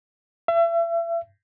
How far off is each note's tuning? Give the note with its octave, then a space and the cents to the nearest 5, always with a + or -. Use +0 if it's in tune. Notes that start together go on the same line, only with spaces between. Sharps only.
E5 +35